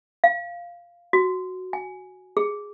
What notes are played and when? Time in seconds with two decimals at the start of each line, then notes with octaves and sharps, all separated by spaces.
0.24 F5
1.13 F#4
1.73 G#5
2.37 G#4